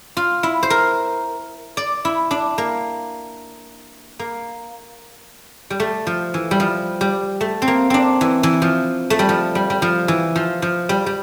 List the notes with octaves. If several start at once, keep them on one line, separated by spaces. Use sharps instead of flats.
F4
E4
C5
A#4
D5
E4
D4
A#3
A#3
G3
A3
F3
E3
G3
F3
G3
A3
C4
A#3
C4 D4
E3
E3
F3
A3
G3
F3
G3
G3
F3
E3
F3
F3
G3
G3